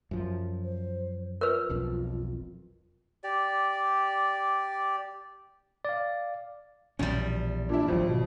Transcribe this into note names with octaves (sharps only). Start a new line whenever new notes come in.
F#2 F3
C5
F4 A#4 B4
E1 B1 F2
G4 D5
D5 F5
A#1 E2 B2 G3 C#4
A#2 D4 E4
G#1 F2 F3 F#3
B2